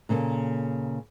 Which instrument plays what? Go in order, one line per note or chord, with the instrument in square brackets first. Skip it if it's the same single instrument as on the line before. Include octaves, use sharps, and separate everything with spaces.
[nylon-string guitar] A#2 C#3 A#3 A4